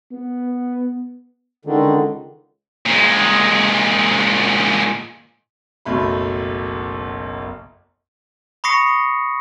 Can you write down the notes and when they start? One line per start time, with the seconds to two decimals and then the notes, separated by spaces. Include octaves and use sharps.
0.11 B3
1.65 C#2 D3 D#3
2.86 A#2 G#3
5.85 F#1 B1 A3 B5
8.64 B5 C#6 D#6 A#6 C7 C#7